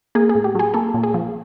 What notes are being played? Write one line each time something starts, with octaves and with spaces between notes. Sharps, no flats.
A#3 G#4
G#4
A2
G4
F#3 G#4
A#3 A4
A#2
G#4
F3